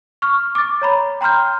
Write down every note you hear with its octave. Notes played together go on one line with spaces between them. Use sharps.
C#6 F6
D6 A6
C#5 A#5 B5
G5 A#5 C6 F6 G6